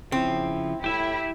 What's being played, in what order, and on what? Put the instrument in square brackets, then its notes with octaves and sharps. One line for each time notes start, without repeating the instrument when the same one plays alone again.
[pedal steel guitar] C#3 F3 [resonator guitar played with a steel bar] C4 [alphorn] E4
[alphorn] A2 [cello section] E4 [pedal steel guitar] G4 E5